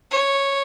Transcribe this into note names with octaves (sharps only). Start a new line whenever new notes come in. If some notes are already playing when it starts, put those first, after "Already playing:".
C#5